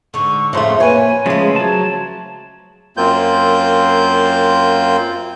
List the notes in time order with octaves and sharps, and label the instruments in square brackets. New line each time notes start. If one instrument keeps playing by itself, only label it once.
[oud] G#2 D3 [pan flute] C#6
[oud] F2 C#3 [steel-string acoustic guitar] A2 F3 A3 [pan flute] C6
[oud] A#3 [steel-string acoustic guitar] B4 C#5 [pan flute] G#5
[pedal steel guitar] C#3 F3 G#3 [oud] A3 G#4 [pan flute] F5
[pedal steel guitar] F#3 A5 [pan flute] C#5
[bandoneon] F#2 A#3 C4 F4 G6